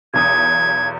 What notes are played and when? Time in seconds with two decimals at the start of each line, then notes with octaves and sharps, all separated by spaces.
0.14 B1 E2 D#6 G#6